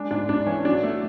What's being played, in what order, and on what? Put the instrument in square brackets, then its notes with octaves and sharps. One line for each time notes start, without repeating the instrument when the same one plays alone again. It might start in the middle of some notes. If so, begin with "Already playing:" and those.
Already playing: [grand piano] G#3 D4
G#2 D4
G#2 D4
E3 C#4
F#3 D4
A3